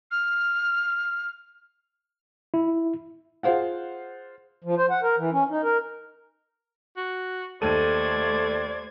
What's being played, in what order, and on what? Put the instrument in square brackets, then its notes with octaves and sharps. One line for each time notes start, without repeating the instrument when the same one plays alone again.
[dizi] F6
[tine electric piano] E4
[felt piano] F4 G#4 C5 F5 F#5
[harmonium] F3
C5
F#5
A#4
E3
C#4
D#4
A#4
[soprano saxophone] F#4
[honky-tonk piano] D#2 D#7 [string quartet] A3 C5 G#6 [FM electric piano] A4 [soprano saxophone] D5